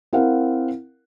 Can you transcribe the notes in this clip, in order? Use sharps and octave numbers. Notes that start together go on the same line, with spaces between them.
C4 E4 A#4 F5 F#5